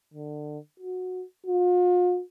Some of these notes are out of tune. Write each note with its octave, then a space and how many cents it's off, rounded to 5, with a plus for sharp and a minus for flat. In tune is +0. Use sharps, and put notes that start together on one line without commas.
D3 +25
F#4 -15
F4 +45